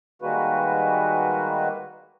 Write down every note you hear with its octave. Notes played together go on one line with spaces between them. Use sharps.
D#3 G3 G#3 A#3 F#4 B4